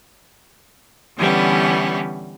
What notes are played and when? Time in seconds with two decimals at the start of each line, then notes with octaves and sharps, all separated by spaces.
1.18 D3 E3 G3 B3 C#4